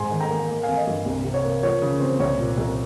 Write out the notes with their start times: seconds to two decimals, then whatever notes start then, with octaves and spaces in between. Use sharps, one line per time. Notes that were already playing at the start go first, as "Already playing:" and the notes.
Already playing: G#2 G#5 C6
0.11 D#3
0.20 G5 A#5
0.30 A#3
0.49 A#3
0.63 G#1 F5 G#5
0.77 D#5
0.87 G2
1.06 C2
1.24 C3
1.34 C#5
1.44 A#3
1.63 F3 C#5
1.82 C#3
2.00 C4
2.19 C2 C#5
2.39 A#2
2.57 C2